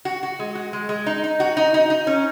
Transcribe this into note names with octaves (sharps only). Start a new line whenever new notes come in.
F#4
F#4
G#3
F#4
G#3
G#3
D#4
D#4
F#4
D#4
D#4
D#4
C#4